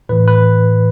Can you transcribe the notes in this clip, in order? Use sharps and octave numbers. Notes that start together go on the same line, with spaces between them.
A2 E3 B4
B4